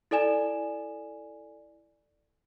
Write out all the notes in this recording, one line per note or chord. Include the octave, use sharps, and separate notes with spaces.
E4 A4 D5 G#5 E7